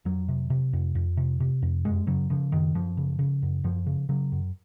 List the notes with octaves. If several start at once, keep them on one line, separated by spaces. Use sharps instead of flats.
F2 F#3
C3
C3
F2
F2
C3
C3
F2
F#2 G#3
C#3 F#3
C#3 F3
F#2 D#3
F#2 F3
C#3
C#3
F#2
F#2 F3
C#3
C#3 F#3
F#2